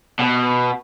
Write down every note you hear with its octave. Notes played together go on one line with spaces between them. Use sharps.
B2